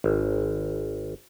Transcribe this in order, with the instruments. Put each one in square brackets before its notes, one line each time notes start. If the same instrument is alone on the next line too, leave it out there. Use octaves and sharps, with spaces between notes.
[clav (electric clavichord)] G#1